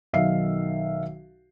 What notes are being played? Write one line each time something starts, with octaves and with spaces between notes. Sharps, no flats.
B1 D#3 E5 F5 C7